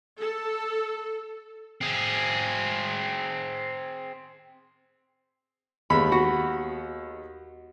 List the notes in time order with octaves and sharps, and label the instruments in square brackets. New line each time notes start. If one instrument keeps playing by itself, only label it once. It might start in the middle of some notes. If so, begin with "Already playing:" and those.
[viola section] A4
[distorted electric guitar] C4 G#4
[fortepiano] D#2 G#3 B3 [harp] B5
[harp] F#4